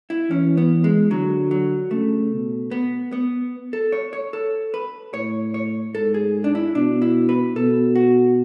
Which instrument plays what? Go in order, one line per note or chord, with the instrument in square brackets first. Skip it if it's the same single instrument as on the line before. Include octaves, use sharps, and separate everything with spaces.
[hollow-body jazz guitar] E4
[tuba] E3 [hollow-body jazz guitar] C#4
[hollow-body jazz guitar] B3
G#3
[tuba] D3 [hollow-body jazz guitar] F#3
[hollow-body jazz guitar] F#3
[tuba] C#3 [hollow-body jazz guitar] A3
[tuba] B2
[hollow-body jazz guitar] B3
B3
A4
C#5
C#5
A4
B4
[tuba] A2 [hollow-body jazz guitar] C#5
[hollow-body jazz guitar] C#5
[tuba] G#2 [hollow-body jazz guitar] A4
[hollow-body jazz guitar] G#4
D4
E4
[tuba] B2 [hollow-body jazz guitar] D4
[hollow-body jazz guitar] E4
B4
[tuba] B2 [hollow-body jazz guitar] A4
[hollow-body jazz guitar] F#4